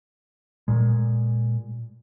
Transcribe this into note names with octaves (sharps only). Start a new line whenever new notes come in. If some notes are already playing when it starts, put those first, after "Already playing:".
A#2 G#3